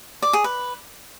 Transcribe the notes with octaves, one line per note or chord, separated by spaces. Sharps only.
D5
G#4
B4